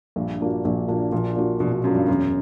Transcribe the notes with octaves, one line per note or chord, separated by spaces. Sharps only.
A#1 G2
A#2 A#3 D4 F#4
A#1
A#2 A#3 D4 F#4
A#1 A#2
A#2 A#3 D4 F#4
A#1 B2
B2
F#2 A#2 A#3 D4 F#4
G2
E1 F#2